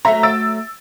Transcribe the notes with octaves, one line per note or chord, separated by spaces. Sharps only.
F#3 A3 E5 A#5
E6 A6 D7